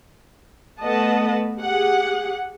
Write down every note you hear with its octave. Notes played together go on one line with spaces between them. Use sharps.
A3 B3 B4 D#5 F#5 A5
G4 G#4 F#5